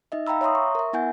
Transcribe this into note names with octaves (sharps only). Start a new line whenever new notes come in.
D#4 D#5 E5
F5 G5 A#5 B5 E6
C#5 E5 A#5 C6 D#6
C#6
A#4 E5
B3 E4 F#5 G#5 G6